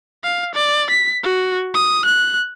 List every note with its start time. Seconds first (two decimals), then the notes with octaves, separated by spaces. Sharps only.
0.23 F5
0.55 D5
0.90 B6
1.24 F#4
1.74 D#6
2.06 F#6